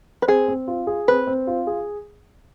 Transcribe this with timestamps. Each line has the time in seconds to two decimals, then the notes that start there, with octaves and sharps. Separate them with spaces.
0.22 B4
0.28 C4 G#4
0.48 C4
0.68 F4
0.87 G#4
1.08 C4 B4
1.27 C4
1.47 F4
1.67 G#4